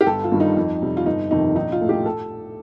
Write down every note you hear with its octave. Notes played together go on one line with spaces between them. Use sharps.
G4
G1 A4
F4
G2 D#3 G3
D#4
F2
C3 G3
F4
G1 D#4
F2 C3 D#3 D#4
A#1 D#4
F4
A2 A3
G4
A4